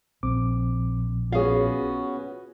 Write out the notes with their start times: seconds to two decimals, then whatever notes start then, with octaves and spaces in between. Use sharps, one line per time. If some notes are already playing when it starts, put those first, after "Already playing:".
0.23 A#1 C4 D6
1.32 B3 C#4 F4 F#4 G#4 C#5 F5